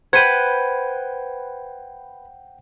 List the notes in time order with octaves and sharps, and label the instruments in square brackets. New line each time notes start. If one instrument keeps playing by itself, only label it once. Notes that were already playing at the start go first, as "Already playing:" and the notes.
[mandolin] B4 B5 [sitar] C5 [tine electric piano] F#5 G5 [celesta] G#6 D#7